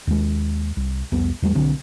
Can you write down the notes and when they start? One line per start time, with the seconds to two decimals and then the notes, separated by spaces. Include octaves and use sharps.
0.07 D#2 G#3
0.77 C2
1.12 C2 F2 B3
1.42 E2 G3 A3
1.55 B1 D3 C4